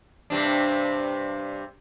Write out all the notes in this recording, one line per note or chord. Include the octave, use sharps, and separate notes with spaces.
G2 C3 D4